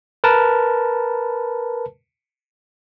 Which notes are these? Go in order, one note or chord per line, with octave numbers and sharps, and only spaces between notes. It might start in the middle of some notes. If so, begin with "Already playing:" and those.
A#4 B4 A5